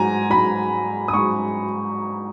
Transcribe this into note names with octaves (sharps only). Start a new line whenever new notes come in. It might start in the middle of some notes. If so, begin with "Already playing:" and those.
Already playing: G#2 F#3 G#5 A#5
G#2 F#3 B5
D#6
G#2 F#3 C#6